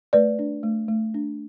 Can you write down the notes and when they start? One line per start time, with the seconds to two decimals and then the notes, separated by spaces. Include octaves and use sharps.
0.13 A3 B4 D5
0.39 D4
0.63 A3
0.88 A3
1.14 D4